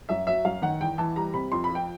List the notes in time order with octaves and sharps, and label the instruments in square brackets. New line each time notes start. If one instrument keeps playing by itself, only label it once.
[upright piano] F#2 E5
F#3 E5
F#2 F5
D#3 F#5
E2 G5
E3 A5
G3 A#5
C3 B5
F2 C6
B5
F3
G5